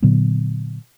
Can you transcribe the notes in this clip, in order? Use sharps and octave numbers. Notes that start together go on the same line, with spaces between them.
A#2 D3 F#3 B3